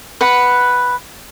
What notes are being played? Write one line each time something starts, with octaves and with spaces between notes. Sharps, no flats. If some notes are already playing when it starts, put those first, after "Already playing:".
B4 F#5